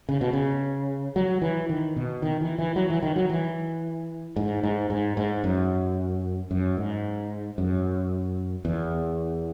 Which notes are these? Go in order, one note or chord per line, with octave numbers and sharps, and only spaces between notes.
C#3
B2
C#3
F#3
E3
D#3
B2
D#3
E3
E3
F#3
E3
D#3
F#3
E3
G#2
G#2
G#2
G#2
F#2
F#2
G#2
F#2
E2